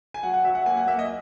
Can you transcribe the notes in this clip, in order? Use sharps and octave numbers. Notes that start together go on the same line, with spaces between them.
G#5
F#3 F#5
F#5
F#3 E5
F#5
A#3 G#5
F#5
A#3 E5
D#5